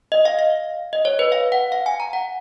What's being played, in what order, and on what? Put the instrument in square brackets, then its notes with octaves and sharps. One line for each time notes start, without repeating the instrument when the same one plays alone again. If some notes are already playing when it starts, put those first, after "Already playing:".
[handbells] D#5
F5
F5
D#5
C#5
B4
F5
F#5
F5
G#5
A#5
F#5